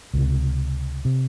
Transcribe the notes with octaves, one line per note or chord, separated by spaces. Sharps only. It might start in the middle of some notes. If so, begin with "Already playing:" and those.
C#2 C3
C3